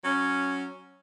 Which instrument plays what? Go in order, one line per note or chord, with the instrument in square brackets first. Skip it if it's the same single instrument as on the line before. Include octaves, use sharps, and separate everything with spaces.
[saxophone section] F#3 C#4